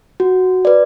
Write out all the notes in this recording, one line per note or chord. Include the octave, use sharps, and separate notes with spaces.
F#4
B4 D5